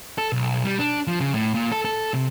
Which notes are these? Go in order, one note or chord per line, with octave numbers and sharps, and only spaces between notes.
A4
B1
G3
D4
F3
C#3
A2
A#2
A4
A4
C3